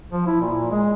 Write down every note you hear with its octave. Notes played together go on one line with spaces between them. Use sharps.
F3
E4
A#2
A#2
G#3